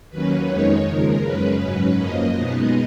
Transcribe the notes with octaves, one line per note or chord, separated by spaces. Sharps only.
D#2 D#3 F#3 A#3 C#4 B4
F2 D#3 G#3 D#4 C#5
D#2 C#3 F3 G#3 A#4
F#2 C#3 G#3 C#4 B4
G#2 F#3 C#4
F#2 F3 A#3 D#5
B2 G#3 B3 D#4 D#5